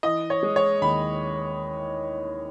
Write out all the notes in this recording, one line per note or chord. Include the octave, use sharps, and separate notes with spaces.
E3 D#5
C#5
G#3
C#5
D#2 B5